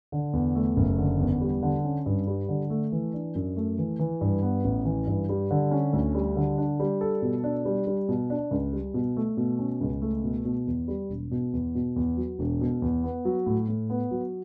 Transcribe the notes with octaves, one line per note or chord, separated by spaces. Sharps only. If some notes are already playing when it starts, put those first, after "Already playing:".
D3
E2
A3
F#1
D3
E2
G3
D3
C#4
G2
G3
D3
A3
E3
D4
F#2
A3
E3
E3
G2
B3
A1
E3
G2
G3
D3
C#4
D2
G3
D3
D4
G3
A4
B2
D4
G3
G3
B2
D4
C#2
G3
B2
A3
B2
C#4
C#2
A3
B2
B2
E2
G3
E1
B2
E2
B2
E2
F#3
E1
B2
E2
B3
F#3
A2
A2
B3
F#3